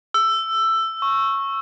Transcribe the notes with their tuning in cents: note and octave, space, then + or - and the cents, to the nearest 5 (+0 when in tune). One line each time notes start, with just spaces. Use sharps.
E6 +10
C#6 -10